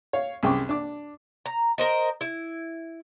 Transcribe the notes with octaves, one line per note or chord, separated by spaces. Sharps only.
C#5 F5
C2 F#2 G#4 G5 C#6 D6
D4 D6
A#5
A#4 C5 D#5
E4